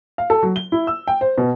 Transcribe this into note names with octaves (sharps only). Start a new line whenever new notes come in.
F5
A4
F#3
G7
E4
E6
G5
C5
B2